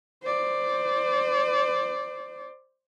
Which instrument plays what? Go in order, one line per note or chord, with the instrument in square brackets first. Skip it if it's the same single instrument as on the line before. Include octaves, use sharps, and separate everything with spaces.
[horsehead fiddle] C5 D5